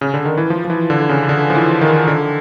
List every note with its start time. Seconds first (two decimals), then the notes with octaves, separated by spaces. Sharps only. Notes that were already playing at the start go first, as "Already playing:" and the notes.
0.01 C#3
0.14 D3
0.25 D#3
0.37 E3
0.50 F3
0.65 F3
0.70 E3
0.90 D3
1.09 C#3
1.29 D3
1.50 F3
1.55 E3
1.81 D#3
2.08 D3